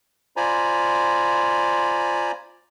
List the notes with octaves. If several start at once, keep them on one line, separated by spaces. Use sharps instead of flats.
F4 C5 D5 G#5 A#5 B5